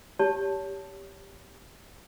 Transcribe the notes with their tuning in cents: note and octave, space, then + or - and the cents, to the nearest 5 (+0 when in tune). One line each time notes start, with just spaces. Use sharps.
G4 +0 C#5 +30 A5 +0